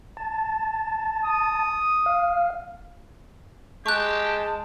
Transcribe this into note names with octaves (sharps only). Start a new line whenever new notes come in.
A5
D#6
F5
G#3 G4 A5 C#6 F#6